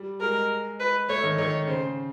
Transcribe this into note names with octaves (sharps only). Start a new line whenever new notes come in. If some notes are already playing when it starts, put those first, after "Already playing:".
Already playing: G3
G#3 A#4
B4
A3 C#5
D#3
D#3 C#5
C#3 C5